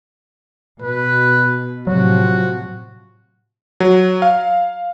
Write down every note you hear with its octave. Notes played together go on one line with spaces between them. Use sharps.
B2 B4
A2 C3 F3 F#3 F#4
F#3
F5